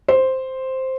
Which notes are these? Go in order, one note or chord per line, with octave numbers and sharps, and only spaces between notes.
C5